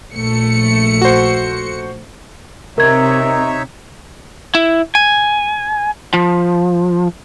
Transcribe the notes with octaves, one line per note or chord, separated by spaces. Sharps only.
A#1 A3 C#7
F#4 C5
C3 D#4 A#4 C#5 E5 G#6
E4
G#5
F3